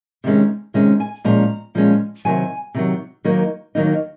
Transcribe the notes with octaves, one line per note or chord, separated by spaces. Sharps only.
C3 D#3 G#3 C#4
C3 D#3 G#3 C#4
G#5
A#2 F3 G#3 C#4 A#5
A#2 F3 G#3 C#4
C3 D#3 F#3 G#5
C3 D#3 F#3
D#2 D#3 F#3 A#3 D#4
D#2 D#3 F#3 A#3 D#4